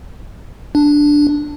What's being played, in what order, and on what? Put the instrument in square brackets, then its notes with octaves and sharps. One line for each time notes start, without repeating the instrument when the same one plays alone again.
[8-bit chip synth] D4